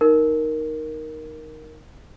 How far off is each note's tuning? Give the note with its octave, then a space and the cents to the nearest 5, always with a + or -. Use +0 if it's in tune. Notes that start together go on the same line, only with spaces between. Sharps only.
D#4 +0 A#4 +0